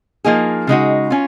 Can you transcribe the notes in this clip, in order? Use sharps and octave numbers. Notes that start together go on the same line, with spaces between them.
F3 A#3 D#4 G#4
C#3 G#3 D#4 F#4
C#4 F4